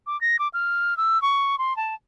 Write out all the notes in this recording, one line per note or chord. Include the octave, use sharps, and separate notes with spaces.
D6
A#6
D6
F6
E6
C#6
C6
A5